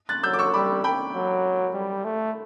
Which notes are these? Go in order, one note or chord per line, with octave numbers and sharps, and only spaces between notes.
F#6 A6
F#3 E6 G6
D6
C#6 E6
G3 B5 D6
G5 B5
F#3
G3
A3